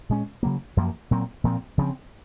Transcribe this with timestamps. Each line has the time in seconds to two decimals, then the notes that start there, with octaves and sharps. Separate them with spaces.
0.09 A#2 G#3 C#4
0.43 C#3 F#3 A#3
0.77 F#2 F3 A#3
1.11 A#2 F#3 C4
1.44 A#2 F3 C4
1.78 C#3 F3 C4